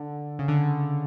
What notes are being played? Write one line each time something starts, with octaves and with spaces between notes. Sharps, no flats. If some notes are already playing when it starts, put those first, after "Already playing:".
Already playing: D3
C#3
D3